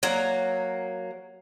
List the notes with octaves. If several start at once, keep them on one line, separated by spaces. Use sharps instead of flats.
F#3 A#3